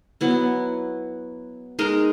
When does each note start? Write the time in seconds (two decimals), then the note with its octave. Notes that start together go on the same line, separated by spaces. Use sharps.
0.21 F#3 B3 E4
1.79 G#3 D#4 A#4